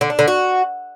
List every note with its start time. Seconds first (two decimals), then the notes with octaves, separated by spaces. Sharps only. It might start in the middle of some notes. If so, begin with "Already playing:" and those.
0.01 D3
0.10 D4
0.19 D3
0.28 F#4